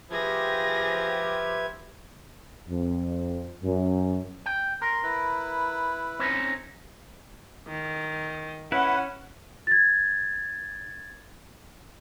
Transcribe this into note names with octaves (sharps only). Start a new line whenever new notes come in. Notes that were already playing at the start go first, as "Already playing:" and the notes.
F3 G4 G#4 B4 E5 G#6 A#6
F2
F#2
G5
A#4 A#5 C6
E4 B4
C4 C#4 D#4
D#3
C#4 E4 B4 F#5
G#6 A6